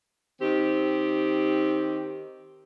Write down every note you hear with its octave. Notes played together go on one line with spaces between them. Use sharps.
D#3 C4 G4